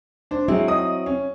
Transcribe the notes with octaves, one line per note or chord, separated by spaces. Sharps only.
D4 C5
F#3 G#3 C4 E4
D#5 D#6
C#4